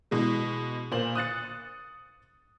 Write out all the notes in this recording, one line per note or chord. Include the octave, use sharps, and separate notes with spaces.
B2 E3 G#3
A#2 C5 F#7
D#6 F#6 A6 C#7